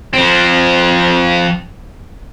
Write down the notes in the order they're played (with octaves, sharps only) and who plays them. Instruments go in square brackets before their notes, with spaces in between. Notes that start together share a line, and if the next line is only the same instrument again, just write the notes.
[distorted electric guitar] F3 C4